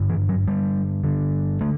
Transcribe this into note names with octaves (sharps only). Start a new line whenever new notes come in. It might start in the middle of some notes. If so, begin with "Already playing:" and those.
Already playing: G2 D3
E3
F#3
G2 D3 G3
G2 D3
D3 A3